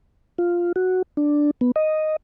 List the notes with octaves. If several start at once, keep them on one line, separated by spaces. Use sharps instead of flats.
F4
F#4
D4
B3
D#5